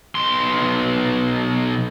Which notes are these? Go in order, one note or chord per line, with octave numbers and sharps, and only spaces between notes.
B1 C6